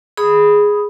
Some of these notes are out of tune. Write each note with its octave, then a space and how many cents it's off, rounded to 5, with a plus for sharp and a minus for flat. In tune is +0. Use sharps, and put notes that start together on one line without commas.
G#4 +0 B5 +0 D#6 +0